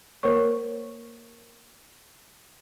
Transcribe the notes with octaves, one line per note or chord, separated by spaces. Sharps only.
A#3 A#4 C5 C#5 C#6